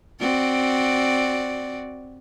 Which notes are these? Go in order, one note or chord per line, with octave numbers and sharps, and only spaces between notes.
C4 F#4 D5